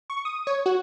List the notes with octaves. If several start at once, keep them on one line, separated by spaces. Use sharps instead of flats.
C#6
D#6
C#5
F#4